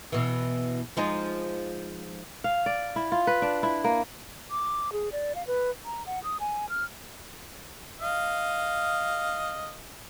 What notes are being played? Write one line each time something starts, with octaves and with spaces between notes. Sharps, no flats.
B2 E3
F3 G#3 D#4
F5
D5
E4
F4
B4
D4
E4
A#3
D6
G#4
D5
F5
B4
A#5
F#5
D#6
G#5
F6
D#5 F5